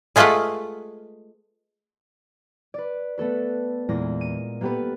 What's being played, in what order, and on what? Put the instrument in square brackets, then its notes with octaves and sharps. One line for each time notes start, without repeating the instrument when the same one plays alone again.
[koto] G#3 A3 F4 B4 D#5 F#5
[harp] B4 D5
A3 B3 A4 B4
E2 A#2 G#3 A#3 D5 A#6
D#7
A#3 B3 G4 A4 B4